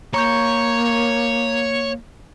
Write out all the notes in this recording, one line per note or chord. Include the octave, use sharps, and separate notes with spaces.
A#3 C#5 A#5 C#6 G6